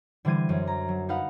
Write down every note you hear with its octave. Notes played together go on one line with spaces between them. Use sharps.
D3 E3 G3 C5 G#6 D#7
F#2
A#5
F#3
D#4 B4 F5 F#5